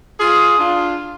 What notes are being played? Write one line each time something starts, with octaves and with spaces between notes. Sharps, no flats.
F4 G#4
D4 F4